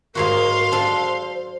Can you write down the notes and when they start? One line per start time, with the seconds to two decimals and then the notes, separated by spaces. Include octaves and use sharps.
0.15 G#2 F#3 F#4 A#4 F5 C6
0.72 D4 A4 C5